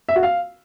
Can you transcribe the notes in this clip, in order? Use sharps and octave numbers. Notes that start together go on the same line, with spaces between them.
E5
F#4
F5